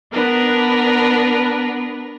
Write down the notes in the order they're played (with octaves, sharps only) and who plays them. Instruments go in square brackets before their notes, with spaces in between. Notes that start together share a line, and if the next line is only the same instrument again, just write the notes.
[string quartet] B3 D4 A#4 B4